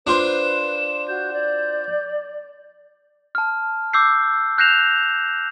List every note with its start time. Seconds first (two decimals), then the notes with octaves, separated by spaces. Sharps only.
0.07 D4 F4 B4 C5 E7
1.08 F#4 G6
1.33 D5
3.35 A5 F6
3.93 D6 E6 G6 C7
4.58 F#6 G6 A#6 C7 E7 F7